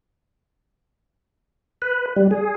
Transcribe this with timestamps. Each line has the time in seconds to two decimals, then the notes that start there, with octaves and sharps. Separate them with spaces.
1.82 B4
2.16 G3
2.31 G#4